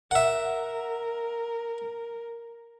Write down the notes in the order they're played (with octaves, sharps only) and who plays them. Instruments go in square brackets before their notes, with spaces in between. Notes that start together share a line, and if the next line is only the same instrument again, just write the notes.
[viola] A#4 [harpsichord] E5 F#5